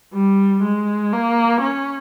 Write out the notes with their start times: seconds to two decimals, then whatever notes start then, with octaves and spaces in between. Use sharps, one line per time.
0.14 G3
0.63 G#3
1.13 A#3
1.61 C#4